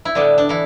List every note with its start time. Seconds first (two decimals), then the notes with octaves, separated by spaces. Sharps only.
0.05 E4
0.15 A2 D3 G3 B3 D4
0.38 D4
0.49 E3 E4